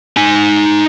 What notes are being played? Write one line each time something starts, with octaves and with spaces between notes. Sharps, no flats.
D#4 G#5